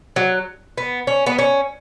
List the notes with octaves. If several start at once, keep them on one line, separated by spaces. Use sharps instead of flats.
F#3
B3
C#4
B3
C#4